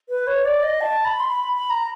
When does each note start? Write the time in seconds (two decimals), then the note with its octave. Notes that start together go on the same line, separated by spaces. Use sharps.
0.09 B4
0.27 C#5
0.45 D5
0.63 D#5
0.81 A5
1.05 B5
1.20 C6
1.28 B5
1.52 B5
1.70 A#5